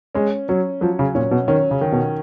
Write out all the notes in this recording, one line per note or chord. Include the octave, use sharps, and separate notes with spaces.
G#3 C#4
F#3 C#4
F3 F#3
C#3
A#2 C#4
B2
D#3 C#4
C#3
D#3
B2